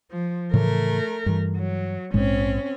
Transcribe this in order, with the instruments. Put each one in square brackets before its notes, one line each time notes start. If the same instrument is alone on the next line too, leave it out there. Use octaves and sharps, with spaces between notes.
[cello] F3
[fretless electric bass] A2 C#3 E3 [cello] A3 A#4
[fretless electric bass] G2 E3
[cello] F#3
[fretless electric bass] A#1 G#2 G#3 [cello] C4 C#4